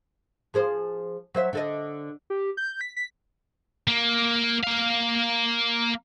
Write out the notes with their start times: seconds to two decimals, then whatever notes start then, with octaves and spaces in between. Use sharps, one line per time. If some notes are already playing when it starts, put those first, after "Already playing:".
0.54 F3 G#4 C5
1.35 F#3 C5 E5
1.53 D3 A4 D#5
2.30 G4
2.57 G6
2.81 B6
2.96 B6
3.88 A#3
4.63 A#3 F5